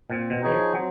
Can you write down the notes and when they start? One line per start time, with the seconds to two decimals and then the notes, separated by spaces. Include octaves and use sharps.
0.10 A#2 C4
0.30 B2
0.41 E3 D#4 G#4 C#5
0.52 F3
0.72 F#3 C4